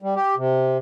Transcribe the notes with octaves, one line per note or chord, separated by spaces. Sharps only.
G3
G4
C3